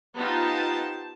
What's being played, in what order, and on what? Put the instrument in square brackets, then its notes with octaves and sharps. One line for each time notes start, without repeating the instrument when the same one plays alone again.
[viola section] B3 D#4 F4 [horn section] G4 C5 A5